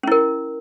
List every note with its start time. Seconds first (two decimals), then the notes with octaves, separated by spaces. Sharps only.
0.03 C#4
0.07 E4
0.12 A#4